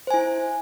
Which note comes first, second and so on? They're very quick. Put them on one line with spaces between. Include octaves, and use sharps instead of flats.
C5 G#5 E4